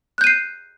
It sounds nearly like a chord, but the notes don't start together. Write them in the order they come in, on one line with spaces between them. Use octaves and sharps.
F#6 G6 D#7 C7